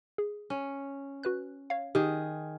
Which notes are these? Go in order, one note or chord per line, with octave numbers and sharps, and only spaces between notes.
G#4
C#4
F#4 B4 F#6
C#5 F5
D#3 G4 G#4